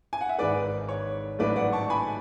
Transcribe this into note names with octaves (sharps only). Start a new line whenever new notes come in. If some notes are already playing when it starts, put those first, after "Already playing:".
G#5
F#5
E5
G#1 G#2 G#3 B4 D5
C#5
A1 G#2 F#3 A3 B4 D5
D5 F#5
A5 C#6
G#5 B5